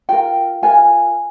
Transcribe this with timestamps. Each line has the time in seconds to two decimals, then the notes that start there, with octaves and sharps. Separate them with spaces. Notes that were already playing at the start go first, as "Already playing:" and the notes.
0.09 F4 A#4 G5
0.62 F4 A#4 G#5